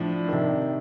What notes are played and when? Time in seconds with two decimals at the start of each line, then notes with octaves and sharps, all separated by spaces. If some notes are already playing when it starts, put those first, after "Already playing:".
Already playing: A2 F3 D4
0.28 C3 D#3